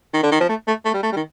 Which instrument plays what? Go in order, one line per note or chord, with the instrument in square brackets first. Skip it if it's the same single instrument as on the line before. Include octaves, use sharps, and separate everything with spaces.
[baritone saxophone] D#3
D3
D#3
F3
A3
A3
A3
G3
A3
G3
D#3